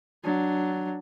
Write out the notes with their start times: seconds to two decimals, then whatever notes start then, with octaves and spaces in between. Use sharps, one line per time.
0.24 F#3 D4